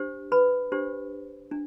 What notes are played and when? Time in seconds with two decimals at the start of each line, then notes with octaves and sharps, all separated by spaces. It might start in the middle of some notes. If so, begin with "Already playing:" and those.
Already playing: D4 G4 C5
0.32 B4 B5
0.72 D4 G4 C5
1.51 D4